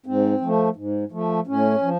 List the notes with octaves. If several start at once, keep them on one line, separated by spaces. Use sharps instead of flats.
G#2 C4
F3 A3
G#2
F3 A3
A2 C#4
F3